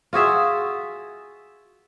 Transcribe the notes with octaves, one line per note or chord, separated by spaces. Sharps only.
F4 F#4 G#4 E5